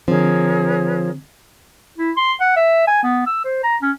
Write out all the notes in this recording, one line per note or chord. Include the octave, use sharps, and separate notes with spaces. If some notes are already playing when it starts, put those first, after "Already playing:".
D3 F3 C4 G#4 A#4 C#5
E4
C6
F#5
E5
G#5
B3
E6
C5
A#5
C#4